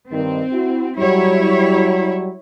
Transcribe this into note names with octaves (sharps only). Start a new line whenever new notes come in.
G2 D#3 C4
E4 F#4
F#3 G3 E4 C#5